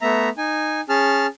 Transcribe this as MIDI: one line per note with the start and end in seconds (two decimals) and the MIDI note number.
0.01 0.29 57
0.01 0.29 59
0.01 0.29 76
0.01 0.29 82
0.37 0.81 63
0.37 0.81 80
0.89 1.27 61
0.89 1.27 68
0.89 1.27 81
0.89 1.27 89